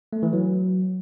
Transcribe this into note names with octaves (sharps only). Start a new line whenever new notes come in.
A3
E3
F#3